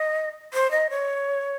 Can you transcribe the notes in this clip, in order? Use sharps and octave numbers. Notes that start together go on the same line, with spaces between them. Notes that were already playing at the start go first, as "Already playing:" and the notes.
Already playing: D#5
C5
D#5
C#5